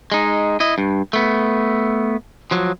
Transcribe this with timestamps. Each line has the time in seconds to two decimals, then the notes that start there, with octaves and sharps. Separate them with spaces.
0.12 G#3 D#4
0.60 E4 D#5
0.78 G2
1.13 A3 B3
2.51 F3 F#3